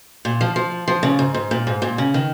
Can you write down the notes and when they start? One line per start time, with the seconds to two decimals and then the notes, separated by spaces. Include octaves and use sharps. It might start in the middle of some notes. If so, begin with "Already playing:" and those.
0.25 A#2
0.41 F3
0.56 F3
0.88 F3
1.03 C#3
1.19 G#2
1.34 G#2
1.51 A#2
1.67 G#2
1.82 A#2
1.98 C#3
2.14 D#3